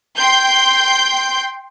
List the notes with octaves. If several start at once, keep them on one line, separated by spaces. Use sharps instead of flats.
G5 C6 G6